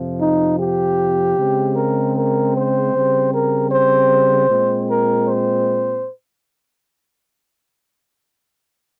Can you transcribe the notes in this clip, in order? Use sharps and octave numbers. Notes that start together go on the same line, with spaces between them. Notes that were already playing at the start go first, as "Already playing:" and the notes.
Already playing: F2 C3 F3
D#4
G4
C#3 G#3 C4
A#4
A#4
C5
C#3 G3 C4
A#4
C5
A#2 G#3 C4
A#4
C5